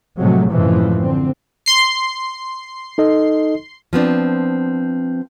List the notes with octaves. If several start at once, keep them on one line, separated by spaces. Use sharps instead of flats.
A2 C3 F3 F#3 G#3 A3
F#2 A2 C3 E3 F3 G#3
D3 C4
C6 C7
D#4 A4 D#5
F3 B3 C4 D4